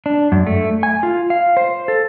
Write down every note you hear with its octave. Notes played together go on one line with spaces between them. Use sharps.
D4
F#2
A3
G#5
F4
F5
C5
A4